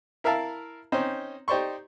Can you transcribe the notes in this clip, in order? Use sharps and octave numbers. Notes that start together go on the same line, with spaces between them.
E4 A#4 E5 F5 A5
C4 C#4 D#4 C5
D#4 G4 C5 D5 C6 C#6